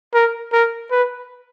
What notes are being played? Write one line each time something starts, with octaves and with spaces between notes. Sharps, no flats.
A#4
A#4
B4